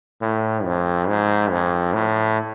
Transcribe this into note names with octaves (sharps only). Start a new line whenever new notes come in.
A2
F2
G#2
F2
A2